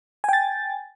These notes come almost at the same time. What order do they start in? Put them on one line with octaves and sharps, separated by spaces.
G#5 G5 A6